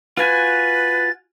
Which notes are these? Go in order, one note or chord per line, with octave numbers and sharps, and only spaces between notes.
F4 F#4 B4 G#5 A6